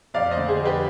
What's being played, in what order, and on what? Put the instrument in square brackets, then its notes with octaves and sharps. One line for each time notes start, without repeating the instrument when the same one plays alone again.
[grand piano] F2 D5 F5
C5 D#5
D3
G#4 C5
F2
G4 B4